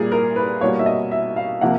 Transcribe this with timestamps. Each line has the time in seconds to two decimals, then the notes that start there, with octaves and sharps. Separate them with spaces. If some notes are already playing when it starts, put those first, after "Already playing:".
Already playing: A#2 G3 A#3 G#4
0.12 A#4
0.36 B4
0.61 B2 G3 A#3 C#5
0.79 E5
0.86 D#5
1.12 E5
1.36 F5
1.61 C3 F3 A#3 F#5